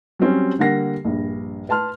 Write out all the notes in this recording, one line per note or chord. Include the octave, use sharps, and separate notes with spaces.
F#3 G3 C4 C#4
D3 G3 A#3 F#5 A#6 C7
A#1 G2
B4 A5 C6 F6